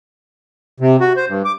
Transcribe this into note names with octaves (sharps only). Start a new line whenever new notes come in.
C3
F#4
C5
G2
D6